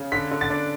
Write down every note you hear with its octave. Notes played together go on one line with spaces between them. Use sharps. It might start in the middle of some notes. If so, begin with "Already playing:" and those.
Already playing: C#3
D3 B6
D3
A6
D4